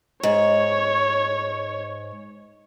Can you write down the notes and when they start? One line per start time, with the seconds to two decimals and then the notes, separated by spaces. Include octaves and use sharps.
0.23 G#2 C#5